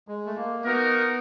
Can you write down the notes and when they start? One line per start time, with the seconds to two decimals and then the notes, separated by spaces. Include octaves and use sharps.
0.08 G#3
0.26 A3
0.36 A#3
0.63 B3 D#4 F#4 A#4